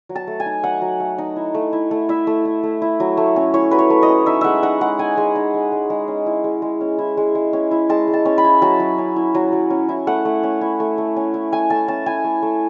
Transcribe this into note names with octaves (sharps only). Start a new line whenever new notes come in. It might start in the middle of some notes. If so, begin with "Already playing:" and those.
F#3
A5
A3
G#5
D#4
F#3 F#5
F#3
A3
D#4
E4
A3
E4
A3
E4 E5
A3
E4
A3
E4
F#3
A3
C#4
E4 C#5
F#3 B4
C#5
A3
D#5
C#4
D#4 E5
G#3 E5 F#5
D#4 F#5
G#3 F#5
D#4 G#5
G#3
D#4
G#3
G#3
G#3
C#4
E4
G#3
G#3
C#4
E4
G#3
G#3
C#4
E4
G#3 A5
G#3
A5
C#4
B5
E4
F#3 A5
F#3
C#4
E4
F#3
F#3
C#4
E4
A3 F#5
A3
C#4
E4
A3
A3
C#4
E4
A3 G#5
A3 A5
C#4 A5
E4 G#5
A3
A3